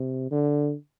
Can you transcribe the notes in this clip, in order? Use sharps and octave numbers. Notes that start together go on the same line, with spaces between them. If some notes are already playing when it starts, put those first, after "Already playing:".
Already playing: C3
D3